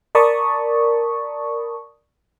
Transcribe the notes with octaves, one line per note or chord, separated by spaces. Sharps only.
A#4 D5 A5 B5 C#6 D#6